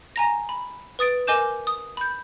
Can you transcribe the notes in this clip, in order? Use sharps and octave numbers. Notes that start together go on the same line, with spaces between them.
G#5 A#5 A#6
B5
B4 D#6 A6 D7
A#4 D#5 G#5 D6 G6 E7
D#6
B5 G6